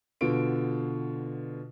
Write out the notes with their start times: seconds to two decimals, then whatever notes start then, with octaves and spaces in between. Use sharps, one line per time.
0.21 B2 D3 F4 D7